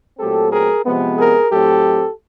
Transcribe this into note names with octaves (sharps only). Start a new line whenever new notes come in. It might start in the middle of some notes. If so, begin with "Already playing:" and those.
A#2 F#3 A3 C4 G4 A4
G#4 A#4
C3 F3 G#3 B3
G#4 A#4
A2 F#3 A3 C4 G4 A4